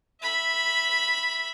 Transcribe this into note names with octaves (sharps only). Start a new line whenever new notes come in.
E5 B5